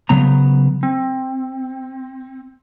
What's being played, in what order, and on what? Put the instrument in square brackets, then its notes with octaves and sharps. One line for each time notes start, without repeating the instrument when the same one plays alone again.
[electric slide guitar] C#3 F#3 B3 A#5
C4